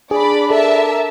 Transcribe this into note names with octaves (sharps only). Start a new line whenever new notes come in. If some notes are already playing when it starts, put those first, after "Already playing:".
D4 G#4 D5 B5
A4 A#4 E5 A5